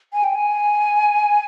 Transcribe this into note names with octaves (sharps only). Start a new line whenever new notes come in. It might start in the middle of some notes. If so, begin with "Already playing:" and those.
G#5
G5
G#5